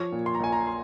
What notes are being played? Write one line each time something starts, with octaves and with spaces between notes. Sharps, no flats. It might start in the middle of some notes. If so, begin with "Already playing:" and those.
Already playing: F3 C#5
A#2
C6
A#5
A#1 G#5
A#5
C6